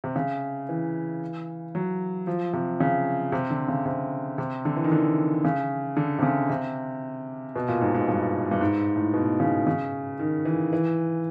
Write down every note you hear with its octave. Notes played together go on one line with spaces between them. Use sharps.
C3
C#3
E3
F#3
F3
C3
C#3
C3
D3
C#3
C3
C3
D3
E3
D#3
D3
C#3
D3
C3
C#3
C3
B2
A#2
G#2
G#2
G2
G2
G#2
A2
B2
C#3
C#3
D#3
E3
E3